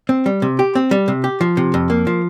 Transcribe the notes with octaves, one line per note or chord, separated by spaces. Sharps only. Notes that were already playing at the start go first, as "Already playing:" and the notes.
C4
G3
C3
G4
C4
G3
C3
G4
F3
C3
F2
A#3
F3